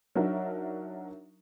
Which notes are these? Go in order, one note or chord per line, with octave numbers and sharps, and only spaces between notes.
F#3 D4 D#4 F#4 A#4 E5